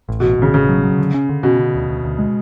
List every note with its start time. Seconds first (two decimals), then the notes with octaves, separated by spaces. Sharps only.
0.09 A1
0.20 A1 B2
0.38 A1 C#3
0.53 A1 C#3
0.69 F#3
0.83 F#3
0.98 D3
1.14 C#4
1.29 D3
1.43 B2 C#4
1.59 D3
1.74 D2
1.89 D2
2.04 D2
2.19 G#3